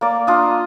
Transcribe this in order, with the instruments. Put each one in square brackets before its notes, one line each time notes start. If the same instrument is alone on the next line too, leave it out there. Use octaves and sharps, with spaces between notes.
[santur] A#3 D5
D4 F4 D#5